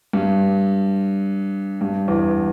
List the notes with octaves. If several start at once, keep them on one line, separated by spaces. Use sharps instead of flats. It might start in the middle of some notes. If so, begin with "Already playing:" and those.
G2
G2
E2